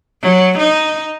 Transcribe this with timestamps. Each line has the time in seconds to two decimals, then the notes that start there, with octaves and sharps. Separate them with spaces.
0.22 F#3
0.59 D#4